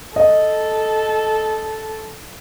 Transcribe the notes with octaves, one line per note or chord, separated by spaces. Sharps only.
A4 D#5